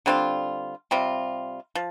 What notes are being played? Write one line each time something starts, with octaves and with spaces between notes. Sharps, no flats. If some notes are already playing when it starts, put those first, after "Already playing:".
D3 G3 C4 F4
C3 G3 C4 F4
F3